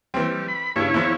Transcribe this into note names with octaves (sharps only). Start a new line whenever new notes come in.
E3 G3 C4
B5
G2 C#3 E4 C#5
E2 F3